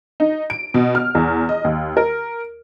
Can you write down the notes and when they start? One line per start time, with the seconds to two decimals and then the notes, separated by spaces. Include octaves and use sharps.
0.20 D#4
0.50 D7
0.74 B2
0.95 F6
1.15 E2
1.49 D#5
1.65 D#2
1.97 A#4